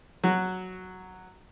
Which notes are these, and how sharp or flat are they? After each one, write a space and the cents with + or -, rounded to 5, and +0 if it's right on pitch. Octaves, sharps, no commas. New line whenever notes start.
F#3 +0 F#4 +0